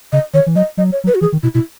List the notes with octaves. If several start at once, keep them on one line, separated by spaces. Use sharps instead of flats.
C#3 D#5
D#3 C#5
E3
F#3 D#5
F#3 D#5
C#5
F#3
B4
F#4
E3 G#4
D#3
B2 E4
B2 E4